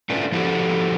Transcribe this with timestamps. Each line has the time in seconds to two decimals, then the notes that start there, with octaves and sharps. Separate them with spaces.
0.10 A3 C#4 D4 E4 F4 B4
0.32 F3 E4 F#4 G4 A4